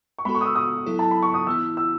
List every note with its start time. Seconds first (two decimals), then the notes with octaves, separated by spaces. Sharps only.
0.18 C#6
0.25 G#3 B3 F#4 A4 B5
0.35 C#6
0.41 D#6
0.45 E6
0.55 D#6
0.86 F#3 B3 E4 A4
0.99 A5
1.11 B5
1.22 C#6
1.34 D#6
1.46 E3 B3 E4 E6
1.77 E6